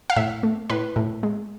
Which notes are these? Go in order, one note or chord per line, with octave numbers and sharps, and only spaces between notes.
F5
A2 E5
A3
A2 B4
A2
G#3